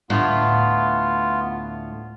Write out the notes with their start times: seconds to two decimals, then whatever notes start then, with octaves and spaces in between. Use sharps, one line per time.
0.10 D2 A2 B3 F4